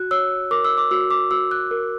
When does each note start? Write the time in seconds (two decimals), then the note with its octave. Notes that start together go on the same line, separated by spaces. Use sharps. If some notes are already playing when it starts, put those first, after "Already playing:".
Already playing: F#4 F#6
0.11 C#5 E6
0.51 A#4 D6
0.65 E6
0.78 D6
0.91 F#4 E6
1.11 D6
1.31 F#4 E6
1.51 F#6
1.71 A#4